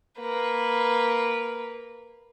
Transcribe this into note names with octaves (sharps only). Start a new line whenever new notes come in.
A#3 B4